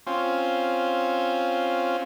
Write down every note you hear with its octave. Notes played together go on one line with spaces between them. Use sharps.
C4 C#4 F4